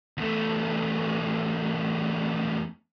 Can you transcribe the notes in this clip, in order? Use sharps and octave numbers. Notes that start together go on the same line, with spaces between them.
E2 A3